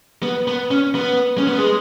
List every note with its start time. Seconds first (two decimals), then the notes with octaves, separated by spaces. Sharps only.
0.23 B3
0.47 B3
0.71 C#4
0.95 B3
1.38 C#4
1.47 B3
1.58 G#3